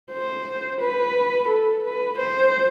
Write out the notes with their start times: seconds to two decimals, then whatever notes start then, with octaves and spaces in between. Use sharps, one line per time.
0.12 C5
0.81 B4
1.49 A4
1.84 B4
2.19 C5